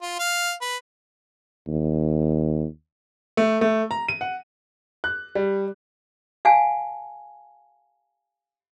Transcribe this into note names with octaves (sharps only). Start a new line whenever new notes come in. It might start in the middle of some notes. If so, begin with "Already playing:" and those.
F4
F5
B4
D#2
A3
A3
A#5
D#7
F#5
F#6
G3
F5 F#5 G#5 A5